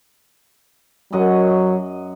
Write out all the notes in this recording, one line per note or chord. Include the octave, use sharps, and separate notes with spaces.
F#2 F#3 D#5 F#5